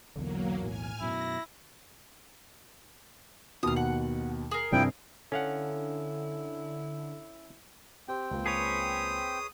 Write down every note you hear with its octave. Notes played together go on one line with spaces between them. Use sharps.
B1 E2 D3 F#3 A#3
A2 G#5 F6
F#2 B2 E4 A#6
D#2 B2 F5 D#6
F#5
G#4 A#4
G2 C3 F3 G3 E4 G5
D3 C#4 E4 A4 F5 F#5
C4 G4 G5
C#2 A#3 F4
G#4 B4 C#5 D#6